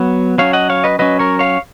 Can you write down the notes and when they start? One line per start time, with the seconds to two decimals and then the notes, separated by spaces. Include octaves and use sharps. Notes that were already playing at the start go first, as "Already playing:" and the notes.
Already playing: F#3 B3
0.38 F#3 C#4 C#5 F5
0.53 D#5 F#5
0.70 C#5 F5
0.84 B4 D#5
0.99 F#3 C#4 B4 D#5
1.19 A#4 C#5
1.39 C#5 F5